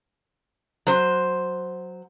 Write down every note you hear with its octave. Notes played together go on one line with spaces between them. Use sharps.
F#3 C5